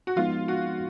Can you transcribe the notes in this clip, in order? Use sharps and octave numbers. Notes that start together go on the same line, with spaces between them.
F#4
F3 G#3 B3 D#4 F4
F#4